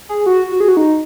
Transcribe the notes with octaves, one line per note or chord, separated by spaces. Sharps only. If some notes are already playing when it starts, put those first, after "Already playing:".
G#4
F#4
F#4
G#4
F#4
D#4